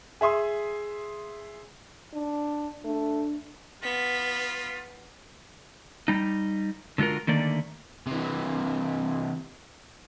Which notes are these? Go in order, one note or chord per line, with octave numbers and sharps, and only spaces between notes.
G#4 E5 C6 D#6
D4
A3 D4
B3 F4 B6
G3 D#4
D3 G#3 F4 F#4 A#4
D3 D#3 A3 A#3 D5
C3 E3